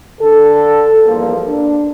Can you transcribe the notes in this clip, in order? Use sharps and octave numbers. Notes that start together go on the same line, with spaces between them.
D3 A4
E2 G2 F3 A#3
D4